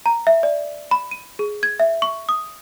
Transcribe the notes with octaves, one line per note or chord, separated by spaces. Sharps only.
A#5
E5
D5
B5
D#7
G#4
G#6
E5
C#6
D#6